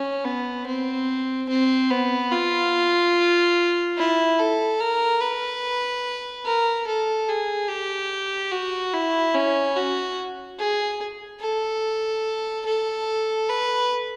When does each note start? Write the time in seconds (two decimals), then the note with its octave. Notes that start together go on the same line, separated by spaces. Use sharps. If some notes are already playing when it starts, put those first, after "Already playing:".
Already playing: C#4
0.25 B3
0.67 C4
1.49 C4
1.91 B3
2.32 F4
3.98 E4
4.39 A4
4.80 A#4
5.21 B4
6.45 A#4
6.87 A4
7.29 G#4
7.70 G4
8.52 F#4
8.94 E4
9.35 C#4
9.76 F#4
10.59 G#4
11.41 A4
12.66 A4
13.49 B4